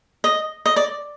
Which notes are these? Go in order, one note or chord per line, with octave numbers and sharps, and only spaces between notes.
D#5
D#5
D5